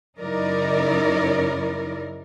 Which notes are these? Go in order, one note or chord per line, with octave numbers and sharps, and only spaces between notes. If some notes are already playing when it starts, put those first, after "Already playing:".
F#2 C#3 D#4 E4 A#4 D5